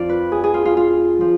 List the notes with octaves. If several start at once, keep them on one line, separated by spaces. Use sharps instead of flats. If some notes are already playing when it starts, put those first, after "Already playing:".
Already playing: F2 F3 D5 F5
B4
G#4
G#4
F4
F4
F4
F3